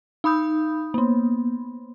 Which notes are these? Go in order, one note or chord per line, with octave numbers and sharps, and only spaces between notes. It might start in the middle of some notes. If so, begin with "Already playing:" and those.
D#4 B5 D#6 G6
A#3 B3